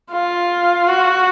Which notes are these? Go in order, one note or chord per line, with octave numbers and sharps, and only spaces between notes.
F4
F#4